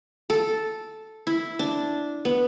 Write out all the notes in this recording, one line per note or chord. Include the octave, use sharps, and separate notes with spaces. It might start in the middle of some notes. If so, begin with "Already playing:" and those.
A4
E4
D4
B3